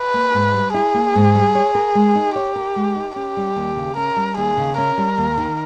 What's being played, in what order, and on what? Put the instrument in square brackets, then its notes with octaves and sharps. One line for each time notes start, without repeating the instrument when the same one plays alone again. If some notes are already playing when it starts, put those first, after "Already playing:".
Already playing: [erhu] B4
[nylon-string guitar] A#3
G#2
G3
[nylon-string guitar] E4 [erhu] G#4
[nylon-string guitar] A#3
G#2
G3
C#5
A#4
G#3
D#4
[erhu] G4 [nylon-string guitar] C#5
[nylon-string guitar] A#4
G#3
D#4
[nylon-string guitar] C#4 [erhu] G4
[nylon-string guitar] G3
D#2
C#3
[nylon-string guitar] C#4 [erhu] A#4
[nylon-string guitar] G3
[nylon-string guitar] D#2 [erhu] G#4
[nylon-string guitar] C#3
[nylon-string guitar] C#4 [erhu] A#4
[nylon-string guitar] G3
D#2
D#3